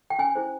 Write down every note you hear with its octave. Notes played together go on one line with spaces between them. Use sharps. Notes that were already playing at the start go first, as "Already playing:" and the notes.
G5
C#4 G#5
E4 G#4 C5